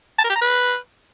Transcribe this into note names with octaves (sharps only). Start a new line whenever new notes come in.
A5
A#4
G4
A#5
B4